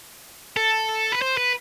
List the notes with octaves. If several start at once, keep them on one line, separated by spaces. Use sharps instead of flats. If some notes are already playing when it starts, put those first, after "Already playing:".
A4
B4
C5
B4